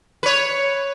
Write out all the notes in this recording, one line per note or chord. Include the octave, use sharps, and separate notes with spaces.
B4 C#5